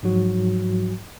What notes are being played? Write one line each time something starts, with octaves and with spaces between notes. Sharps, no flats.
G#2 F3 F#3 F#4